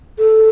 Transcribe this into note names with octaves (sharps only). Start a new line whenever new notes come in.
A4